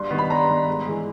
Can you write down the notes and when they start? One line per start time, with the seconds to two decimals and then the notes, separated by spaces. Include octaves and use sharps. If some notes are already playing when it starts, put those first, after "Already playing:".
Already playing: G2 C6
0.11 D#3 G3 B3
0.18 B5
0.30 G2 A#5
0.49 D#3 G3 B3
0.68 G#2
0.86 E3 G#3